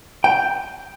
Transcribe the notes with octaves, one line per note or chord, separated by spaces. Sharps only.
G5